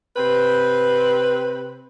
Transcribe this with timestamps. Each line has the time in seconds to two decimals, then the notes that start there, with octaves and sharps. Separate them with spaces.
0.16 C3 C4 B4